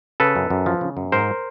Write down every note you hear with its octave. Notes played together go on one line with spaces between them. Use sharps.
C#3 A4 B4
F#2
F#2
F3
C#3
F#2
G#2 A#4 C5